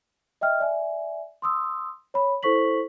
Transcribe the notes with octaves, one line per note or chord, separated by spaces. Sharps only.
D#5 E5 G5 F6
D5 E5 G#5
C6 D#6 E6
C#5 B5
E4 A4 C5 C#6 B6 F#7